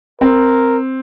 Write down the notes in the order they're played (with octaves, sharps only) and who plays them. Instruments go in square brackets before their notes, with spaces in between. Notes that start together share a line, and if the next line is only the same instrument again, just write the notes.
[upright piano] C4 [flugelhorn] A#4